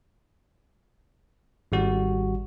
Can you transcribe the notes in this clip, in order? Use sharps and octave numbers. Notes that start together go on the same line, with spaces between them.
G#1 G3 F#4